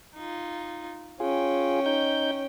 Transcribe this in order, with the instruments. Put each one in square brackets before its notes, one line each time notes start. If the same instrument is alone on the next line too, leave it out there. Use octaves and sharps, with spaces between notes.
[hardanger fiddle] D#4 F4
[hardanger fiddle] C#4 G5 [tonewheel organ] F4 G#4
[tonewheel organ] D#4 G6